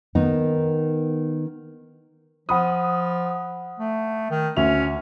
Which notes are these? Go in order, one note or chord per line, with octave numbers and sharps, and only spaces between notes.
D#3 B3 D#4
F3 F#5 B5 D#6
A3
D#3
D2 C#4 E5 F7